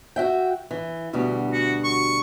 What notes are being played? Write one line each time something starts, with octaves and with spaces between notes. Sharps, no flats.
F#4 E5 G5
E3
D2 B2 G3
F#4
C#6